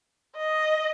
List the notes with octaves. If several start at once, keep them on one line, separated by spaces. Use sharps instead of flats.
D#5